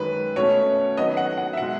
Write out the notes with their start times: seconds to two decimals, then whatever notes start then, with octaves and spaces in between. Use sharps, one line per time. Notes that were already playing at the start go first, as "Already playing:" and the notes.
Already playing: F#2 D#3 G#3 B4
0.36 B2 A3 C#4 C#5
0.97 D#3 F#3 B3 D#5
1.17 F#5
1.38 F#5
1.53 E5
1.57 B2 G#3 F#5